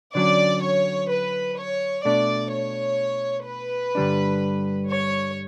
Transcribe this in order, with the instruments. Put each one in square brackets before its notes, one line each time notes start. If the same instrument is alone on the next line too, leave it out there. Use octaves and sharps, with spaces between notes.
[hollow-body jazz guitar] D3 F#3 C#4 [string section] D5
[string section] C#5
B4
C#5
[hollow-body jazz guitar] B2 A3 D4 [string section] D5
[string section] C#5
B4
[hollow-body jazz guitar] G2 D3 G3 D4
[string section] C#5